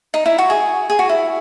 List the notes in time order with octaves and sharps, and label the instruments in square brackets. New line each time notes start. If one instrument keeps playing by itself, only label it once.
[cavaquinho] D#4
E4
F#4
G#4
G#4
F#4
E4